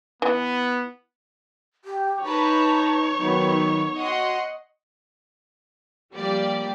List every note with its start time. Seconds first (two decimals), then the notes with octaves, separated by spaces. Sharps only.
0.22 E3 B3
1.85 G4
2.24 D#4 B4 C#5 A5 A#5
3.18 D#3 F#3 B3
3.98 F#4 D#5 F#5 C6
6.13 F3 G3 A#3 G4 D5